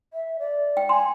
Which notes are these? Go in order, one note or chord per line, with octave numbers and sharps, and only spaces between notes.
E5
D5
G5
G#5 C6